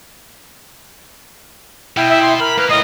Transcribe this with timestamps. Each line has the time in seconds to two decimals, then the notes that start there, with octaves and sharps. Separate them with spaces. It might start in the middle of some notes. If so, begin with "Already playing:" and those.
1.97 B2 E4 G5
2.10 E5
2.22 C6
2.40 A#4 B5 F6
2.58 A#3 B4 F6
2.69 A2 G#3 F4 D#5